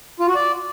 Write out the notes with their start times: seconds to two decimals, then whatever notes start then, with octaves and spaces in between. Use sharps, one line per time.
0.20 F4
0.28 F#4
0.35 D5